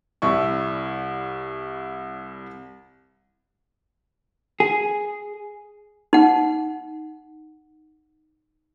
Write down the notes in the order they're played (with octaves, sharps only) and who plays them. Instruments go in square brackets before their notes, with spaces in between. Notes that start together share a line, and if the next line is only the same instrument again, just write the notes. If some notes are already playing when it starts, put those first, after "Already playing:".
[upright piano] C2 E4 C#6
[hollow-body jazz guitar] G#4
[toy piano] D#4 F#5